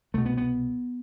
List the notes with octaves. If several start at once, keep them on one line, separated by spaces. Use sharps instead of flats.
C2 B2 A3
B3
B3